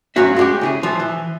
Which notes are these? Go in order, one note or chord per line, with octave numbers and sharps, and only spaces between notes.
G2 F#3 C#4 F4 F#4 E5
G#3 C#4 D4 F#4 G4
C#3 E4 G#4
E3 F3
E3